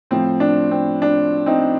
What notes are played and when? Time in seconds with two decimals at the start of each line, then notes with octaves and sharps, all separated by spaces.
0.11 A2 F3 C4
0.40 D4
0.71 C4
1.02 D4
1.46 C4 D#4